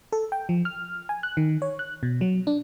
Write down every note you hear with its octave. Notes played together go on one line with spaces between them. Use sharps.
A4
G5
F3
F6
G#5
F#6
D#3
C#5
F#6
B2
F#3
D4